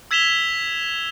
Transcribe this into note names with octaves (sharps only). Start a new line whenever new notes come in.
E6 G#6 B6 E7 F7 G7